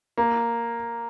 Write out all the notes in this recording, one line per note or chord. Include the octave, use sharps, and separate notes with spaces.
A#3